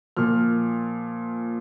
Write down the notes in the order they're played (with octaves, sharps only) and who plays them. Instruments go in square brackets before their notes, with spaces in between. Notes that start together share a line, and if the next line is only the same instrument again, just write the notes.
[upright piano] A#2 F3 F6